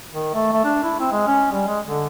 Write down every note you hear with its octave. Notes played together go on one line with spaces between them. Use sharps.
D#3
A3
A3
D4
E4
C4
G#3
C#4
G3
G#3
D3